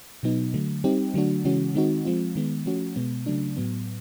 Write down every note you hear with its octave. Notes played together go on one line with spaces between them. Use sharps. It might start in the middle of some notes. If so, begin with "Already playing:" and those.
B2 F#3 B3 D#4
D3 F#3 A3
G3 C4 D#4 G4
D3 F#3 A3 D4 F#4
C#3 E3 G#3 C#4 F#4
D#3 G#3 C4 D#4 F#4
F3 G#3 C4 F4
D#3 G#3 B3
F3 A3 C#4 F#4
B2 G#3 B3
C#3 F#3 A3 D4
A2 F#3 B3